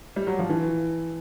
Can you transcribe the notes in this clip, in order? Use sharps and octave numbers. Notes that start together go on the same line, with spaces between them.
G3
F#3
F3
E3